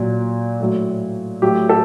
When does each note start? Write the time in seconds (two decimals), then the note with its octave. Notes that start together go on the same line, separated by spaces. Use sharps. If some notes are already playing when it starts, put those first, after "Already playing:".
Already playing: A#2 F#3
0.60 A2 F#3
1.42 A2 F#3 G4
1.69 A4